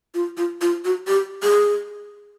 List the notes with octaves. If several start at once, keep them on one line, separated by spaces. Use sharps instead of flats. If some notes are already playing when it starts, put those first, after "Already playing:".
F4
F4
F4
F#4
G4
G#4